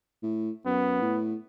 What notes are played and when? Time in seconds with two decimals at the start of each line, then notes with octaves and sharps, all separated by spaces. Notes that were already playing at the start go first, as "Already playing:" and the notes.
0.23 A2
0.66 F#2 B3
1.02 A2